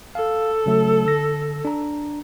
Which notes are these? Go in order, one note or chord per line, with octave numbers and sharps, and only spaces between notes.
A4 F5
C#3 F#3 A3
D3 A#6
D4 A#5